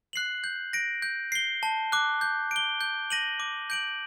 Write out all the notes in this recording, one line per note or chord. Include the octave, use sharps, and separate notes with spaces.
F#6 C7 F#7
G6
A#6 D7
G6
C7 G7
A5
D6 F#6
G6
D7 G7
G6
A#6 D#7 F#7
D6
G6 D7 F#7